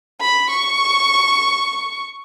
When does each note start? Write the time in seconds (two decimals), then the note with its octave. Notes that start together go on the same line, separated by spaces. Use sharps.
0.21 B5
0.50 C#6